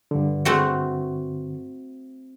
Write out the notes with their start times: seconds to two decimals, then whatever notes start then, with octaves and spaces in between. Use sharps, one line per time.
0.11 G2 D3
0.45 A3 C4 F#4